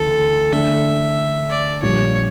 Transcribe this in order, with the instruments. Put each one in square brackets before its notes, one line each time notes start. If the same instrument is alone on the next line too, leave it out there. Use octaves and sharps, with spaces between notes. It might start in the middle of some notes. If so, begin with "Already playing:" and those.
Already playing: [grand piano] D2 C#3 E3 [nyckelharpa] A4
[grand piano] D3 A3 D4 [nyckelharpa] E5
[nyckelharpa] D5
[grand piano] A#1 A#2 G3 D4 [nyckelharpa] C#5